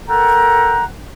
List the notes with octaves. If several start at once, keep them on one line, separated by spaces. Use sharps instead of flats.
A4 A#4 F#5 G5 A#5